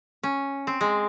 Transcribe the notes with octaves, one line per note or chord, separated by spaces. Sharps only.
C#4
C4
G#3